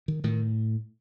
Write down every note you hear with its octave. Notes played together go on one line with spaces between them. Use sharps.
D#3
A2 D#3